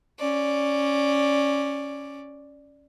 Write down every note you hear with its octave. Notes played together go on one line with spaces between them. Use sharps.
C#4 D5